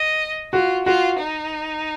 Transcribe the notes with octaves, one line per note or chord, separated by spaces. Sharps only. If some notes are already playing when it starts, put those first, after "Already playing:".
Already playing: D#5
F4 F#4
F4 F#4
D#4